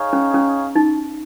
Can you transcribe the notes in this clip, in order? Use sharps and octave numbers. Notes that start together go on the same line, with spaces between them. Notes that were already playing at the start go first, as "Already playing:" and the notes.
Already playing: D#4 G#4 C#5 F5
C#4
C#4
D#4